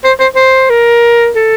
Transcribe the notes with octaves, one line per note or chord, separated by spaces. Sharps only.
C5
C5
C5
A#4
A4